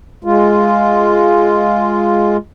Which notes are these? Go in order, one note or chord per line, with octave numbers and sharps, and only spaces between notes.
G#3 F4